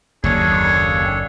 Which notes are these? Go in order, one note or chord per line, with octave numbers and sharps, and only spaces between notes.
F#1 D#2 D4 G#4 A4 C#5